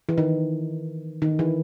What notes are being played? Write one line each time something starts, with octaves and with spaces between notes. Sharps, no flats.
E3
D#3
D#3
E3